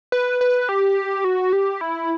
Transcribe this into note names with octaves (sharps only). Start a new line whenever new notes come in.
B4
B4
G4
F#4
G4
E4